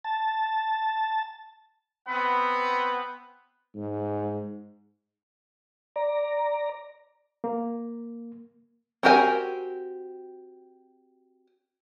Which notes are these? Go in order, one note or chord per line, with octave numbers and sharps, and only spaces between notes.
A5
B3 C4 F#5 B5
G#2
D5 A#5
A#3
C4 F#4 G4 A#4 G#5